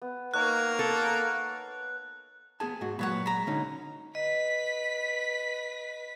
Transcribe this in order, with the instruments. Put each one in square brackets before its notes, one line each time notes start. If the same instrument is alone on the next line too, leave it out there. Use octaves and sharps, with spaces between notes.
[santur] B3
[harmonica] A#3 A#4 [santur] D#4 C#5 D#5 [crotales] F#6
[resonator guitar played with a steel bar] A4
[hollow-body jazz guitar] B3 G#4 A5 [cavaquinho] G#5
[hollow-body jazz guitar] G#2 F#4
[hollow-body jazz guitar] A#2 F#3 G#3 [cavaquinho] B4 C#5 F#5
[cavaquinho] A#5 B5
[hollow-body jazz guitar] D3 C#4 D#4
[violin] B4 B6 [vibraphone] D#5